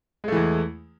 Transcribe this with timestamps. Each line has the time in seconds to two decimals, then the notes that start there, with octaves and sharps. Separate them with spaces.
0.24 G#3
0.28 A3
0.32 E3
0.37 E2